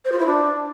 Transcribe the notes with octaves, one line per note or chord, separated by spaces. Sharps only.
C5
F4
E4
D4